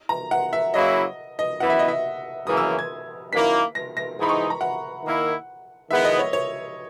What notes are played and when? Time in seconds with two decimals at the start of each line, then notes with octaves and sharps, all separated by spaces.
0.09 A#5
0.31 F#5
0.53 E5
0.74 C#3 F#3 A#3 E4 D#5
1.39 D#5
1.60 F#2 E3 B3 E4 F#5
1.70 E5
1.79 D#5
1.88 E5
2.47 F#2 C#3 E3 A#3 C#4 D#6
2.57 E6
2.79 G#6
3.32 F#2 D#3 A#3 E4 B6
3.75 A#6
3.97 A#6
4.18 G#2 E3 G#3 D#4 B5
4.29 C#6
4.50 A#5
4.61 F#5
5.04 D#3 A#3 E4
5.90 D#3 G#3 B3 E4 E5
6.05 D#5
6.19 C#5
6.33 C#5